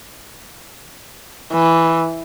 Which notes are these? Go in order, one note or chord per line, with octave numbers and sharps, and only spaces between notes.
E3